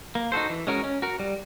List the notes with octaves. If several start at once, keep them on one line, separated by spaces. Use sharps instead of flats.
A#3
D#4 F#4 A4 C5
E3
G#3 C#4 F#4 A#4
C#4
F#4 A#4
G3